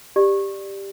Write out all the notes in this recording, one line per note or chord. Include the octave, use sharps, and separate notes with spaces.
G4 D5